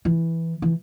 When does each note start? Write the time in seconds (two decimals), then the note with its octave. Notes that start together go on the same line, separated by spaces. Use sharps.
0.05 E3
0.62 E3